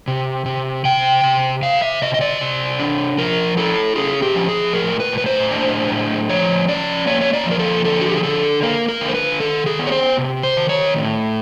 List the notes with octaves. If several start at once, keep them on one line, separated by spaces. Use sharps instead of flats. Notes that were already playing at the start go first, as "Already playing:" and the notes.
C3
C3
C3 G5
C3
C3 F5
E5
C3 D#5
D#5
D5
C3
D4
F3 A#4
E4 A4
C#4 G#4
G4
F3
G#4
A2 A#4
B4
A2
B4
C5
D4
A2
F3 C#5
C#4 D5
A#3 C#5
C#5
D5
F3 A#4
A4
D3 A4
F#4
G4
G#4
D3 A4
A#3 A#4
A#4
D3
C5
B4
D#3 A4
G#4
B3
C#5
C5
C3
C5
D#3
C#5
A2